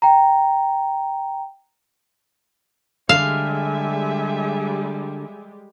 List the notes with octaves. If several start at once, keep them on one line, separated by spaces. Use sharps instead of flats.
G5 A#5
D3 G3 G#3 G4 E5 F5 G#5